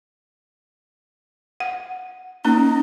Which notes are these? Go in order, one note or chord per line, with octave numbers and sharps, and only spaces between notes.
F#5
A#3 C#4 D#4 A#5